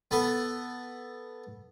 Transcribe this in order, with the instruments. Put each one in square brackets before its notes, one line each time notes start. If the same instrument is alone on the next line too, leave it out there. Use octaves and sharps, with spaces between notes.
[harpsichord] B3 A4 B4